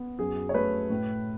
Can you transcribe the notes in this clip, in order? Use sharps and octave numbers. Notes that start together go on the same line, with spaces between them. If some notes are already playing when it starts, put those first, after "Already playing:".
Already playing: B3
F#2 G#4
C#5
A3 B4
A2